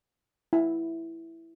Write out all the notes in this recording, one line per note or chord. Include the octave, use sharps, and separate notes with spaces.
E4